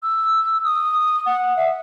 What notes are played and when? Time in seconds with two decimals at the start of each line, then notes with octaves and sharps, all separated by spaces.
0.03 E6
0.64 D#6
1.26 F#5
1.57 E5